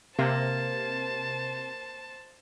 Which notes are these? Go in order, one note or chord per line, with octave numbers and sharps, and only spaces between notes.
C3 A#3 C5 A5